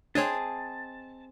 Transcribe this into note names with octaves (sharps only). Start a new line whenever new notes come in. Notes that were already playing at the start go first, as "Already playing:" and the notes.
C4 D4 G#4 C#5 D#5 A5